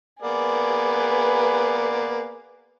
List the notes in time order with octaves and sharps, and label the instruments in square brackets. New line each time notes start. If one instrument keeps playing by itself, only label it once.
[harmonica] A#3 B3 D5 [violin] G#4 B4